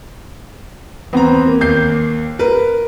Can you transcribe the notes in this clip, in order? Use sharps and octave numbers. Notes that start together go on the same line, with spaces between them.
E2 B3 C4 A#5
A#3
D#2 G6 C7
A#4 B4